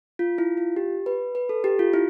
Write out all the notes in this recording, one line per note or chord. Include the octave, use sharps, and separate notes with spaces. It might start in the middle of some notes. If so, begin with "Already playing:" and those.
F4
E4
F4
G4
B4
B4
A4
G4
F4
E4